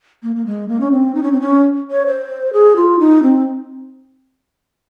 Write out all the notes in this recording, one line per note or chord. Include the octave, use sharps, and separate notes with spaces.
A#3
A#3
G#3
A#3
C#4
C4
D#4
C#4
C4
C#4
C#5
C5
G#4
F4
D#4
C4